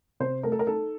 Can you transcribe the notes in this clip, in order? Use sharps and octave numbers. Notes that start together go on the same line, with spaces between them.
C3 C5
A3 A#4
A4
A#4
D#4 A4